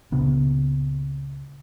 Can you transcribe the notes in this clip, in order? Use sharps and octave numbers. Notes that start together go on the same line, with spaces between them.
C#2 A#2 C#3 B3